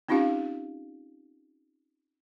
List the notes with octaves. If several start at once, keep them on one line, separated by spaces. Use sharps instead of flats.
C4 C#4 D#4 F4 G4 F5